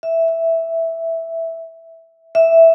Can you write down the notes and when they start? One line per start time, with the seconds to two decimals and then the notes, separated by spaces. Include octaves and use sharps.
0.03 E5
0.28 E5
2.35 E5